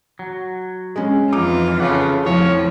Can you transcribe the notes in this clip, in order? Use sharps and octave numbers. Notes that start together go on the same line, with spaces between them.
F#3
G#3 C#4
F2 E3 D#4 F4 D6
C#3 A4 F#5
F2 A2 F3 C#5